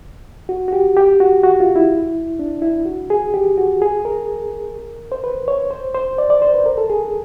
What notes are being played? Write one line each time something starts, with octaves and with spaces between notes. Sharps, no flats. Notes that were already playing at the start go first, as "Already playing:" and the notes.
F#4
F#4
G4
G4
F#4
F#4
F4
E4
D4
E4
F#4
G#4
G4
F#4
G#4
A#4
C5
B4
C#5
C5
C5
D5
D5
C5
B4
A#4
A4
G#4